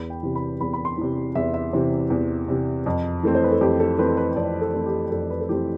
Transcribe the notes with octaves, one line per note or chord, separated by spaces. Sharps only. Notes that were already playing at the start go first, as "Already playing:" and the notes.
Already playing: E2 B5
G5
C3 E3
B5
E2 B5
B5
C6
C3 E3
E2 E5
E5
C3 E3 C5
E2
C3 E3
F2
E3 A3 C4
C5
B4
A4
F2 G4
A4
E3 A3 C4 B4
A4
B4
F2 D5
A4
E3 A3 C4
G4
F2 A4
B4
A4
E3 A3 C4 G4